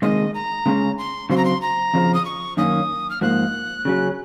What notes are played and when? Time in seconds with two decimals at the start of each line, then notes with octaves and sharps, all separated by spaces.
0.02 C3 D#3 G#3 D#5
0.34 A#5
0.66 C#3 G#3 C#4
0.98 C6
1.30 C#3 F#3 C4 C6
1.37 A#5
1.45 C6
1.62 A#5
1.94 F2 C#3 F3
2.14 D#6
2.25 C#6
2.57 F#2 D#3 A#3 C#4 D#6
3.10 F6
3.21 G#2 F3 A#3 F#6
3.85 C#3 F#3 C#4